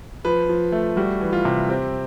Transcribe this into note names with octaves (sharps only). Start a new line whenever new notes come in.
F3 B4
F3
A3
G3 F#4
E3
F4
C3
C4 G4